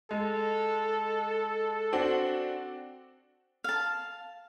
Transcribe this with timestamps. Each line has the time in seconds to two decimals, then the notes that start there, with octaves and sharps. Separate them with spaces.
0.11 G#3 A4
1.93 C4 D4 F#4
3.64 F5 A5